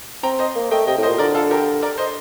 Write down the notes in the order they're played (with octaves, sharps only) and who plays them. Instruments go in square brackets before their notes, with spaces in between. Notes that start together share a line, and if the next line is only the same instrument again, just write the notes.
[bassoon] C4 [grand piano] G5 A#5
[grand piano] C5 D#5
[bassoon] A#3
[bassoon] A3 [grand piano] D#5 G5
[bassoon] C3 [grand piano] D#5 G5
[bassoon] A2
[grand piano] C5 D#5
[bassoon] A#2
[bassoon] D3 [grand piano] A#4 D5
[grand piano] F4 A4
G4 A#4
A#4 D5
C5 D#5